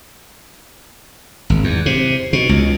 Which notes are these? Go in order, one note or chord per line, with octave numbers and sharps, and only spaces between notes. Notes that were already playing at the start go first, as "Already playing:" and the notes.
G#1
E2
C3
B2
C#2